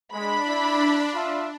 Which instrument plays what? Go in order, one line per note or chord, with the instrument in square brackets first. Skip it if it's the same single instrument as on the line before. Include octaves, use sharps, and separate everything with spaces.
[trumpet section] G#3 [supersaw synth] D4 [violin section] B5
[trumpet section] E4 D5
F4 E5